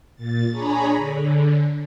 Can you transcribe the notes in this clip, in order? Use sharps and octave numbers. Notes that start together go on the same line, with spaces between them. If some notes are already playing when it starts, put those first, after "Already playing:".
A#2 A6
D4 G#4 C#5 G#5 A#5 B5
D3